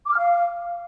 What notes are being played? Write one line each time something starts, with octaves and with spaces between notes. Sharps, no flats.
D6
F6
F5